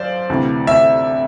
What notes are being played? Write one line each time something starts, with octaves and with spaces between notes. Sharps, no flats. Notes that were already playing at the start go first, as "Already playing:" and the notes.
Already playing: F#2 C5 D5 F5
D2 C3 E3
E5